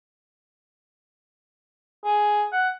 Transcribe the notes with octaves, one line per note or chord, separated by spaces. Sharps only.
G#4
F#5